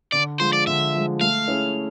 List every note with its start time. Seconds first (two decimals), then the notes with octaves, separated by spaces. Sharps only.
0.12 D3 D5
0.39 F3 G#3 C5
0.53 D5
0.67 D3 E5
0.95 F3 G#3
1.21 A3 F5
1.48 C#4 E4 G#4